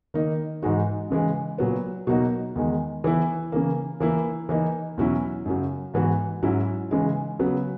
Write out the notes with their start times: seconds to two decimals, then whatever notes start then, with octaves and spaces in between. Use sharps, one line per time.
0.14 D#3 A#3 D#4
0.62 G#2 E3 G#3 D#4 F#4
1.10 C#3 E3 G#3
1.58 A#2 F#3 B3
2.07 B2 F#3 A#3 D#4 F#4
2.55 E2 D#3 G#3
3.04 E3 B3 E4
3.52 C#3 E3 A#3
4.00 E3 A#3 E4
4.49 E3 A#3 D#4
4.97 E2 B2 F#3 C#4 E4
5.46 F#2 C#3 F#3
5.94 G#2 E3 B3 F#4
6.43 G#2 F#3 C#4 E4
6.91 C#3 E3 G#3
7.39 C#3 F#3 B3